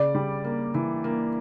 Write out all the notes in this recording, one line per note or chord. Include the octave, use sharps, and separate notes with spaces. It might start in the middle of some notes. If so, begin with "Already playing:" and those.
Already playing: C#3 D5
G3
A#3
E3
A#3